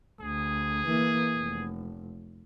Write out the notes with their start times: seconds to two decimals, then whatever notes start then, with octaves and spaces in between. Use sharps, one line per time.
0.20 D2 G#4
0.86 E3 A#3
1.38 F1